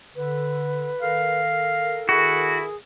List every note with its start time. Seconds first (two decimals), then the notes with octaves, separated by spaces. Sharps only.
0.16 D3 B4
1.02 D#3 A4 A#4 F5
2.09 E4 F#4 G#4